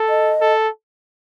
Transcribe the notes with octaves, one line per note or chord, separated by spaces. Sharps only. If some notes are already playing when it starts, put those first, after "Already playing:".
Already playing: A4
D#5
A4